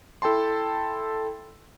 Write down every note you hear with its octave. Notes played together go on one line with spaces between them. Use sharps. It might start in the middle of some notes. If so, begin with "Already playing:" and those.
E4 A4 G5 A5 C6